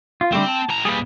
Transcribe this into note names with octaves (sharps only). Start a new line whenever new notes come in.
F4
D3 G3 A3 C4
A5
A2 A#5
A#2 G3 G#4 B4